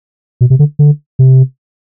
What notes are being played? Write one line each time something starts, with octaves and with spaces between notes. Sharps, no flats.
B2
C3
D3
D3
C3